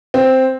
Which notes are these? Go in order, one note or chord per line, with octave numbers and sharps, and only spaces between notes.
C4